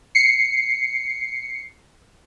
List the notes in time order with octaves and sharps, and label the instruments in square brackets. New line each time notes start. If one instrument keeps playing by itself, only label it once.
[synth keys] C7 C#7